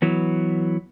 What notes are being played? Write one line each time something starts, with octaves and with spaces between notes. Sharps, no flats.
E3 F#3 B3